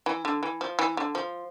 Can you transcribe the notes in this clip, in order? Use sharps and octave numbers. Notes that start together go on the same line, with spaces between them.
E3
D3
E3
F3
E3
D3
F3